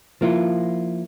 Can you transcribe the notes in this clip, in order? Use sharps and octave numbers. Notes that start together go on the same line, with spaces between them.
F3 A#3 E4 F4